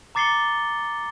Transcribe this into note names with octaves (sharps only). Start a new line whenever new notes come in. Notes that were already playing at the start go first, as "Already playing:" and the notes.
A#5 D6 A6 C7 C#7 G7